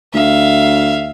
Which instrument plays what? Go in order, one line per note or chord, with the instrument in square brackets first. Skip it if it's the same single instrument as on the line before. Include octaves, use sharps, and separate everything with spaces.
[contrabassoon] D2 [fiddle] E5 F5